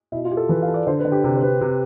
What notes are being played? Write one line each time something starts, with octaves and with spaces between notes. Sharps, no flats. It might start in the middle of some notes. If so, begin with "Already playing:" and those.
B2 E4
F4
G4
A4
E3 B4
F5
A4
D5
D3 C5
B4
D3
G4
C3
C5
C3 B4
C3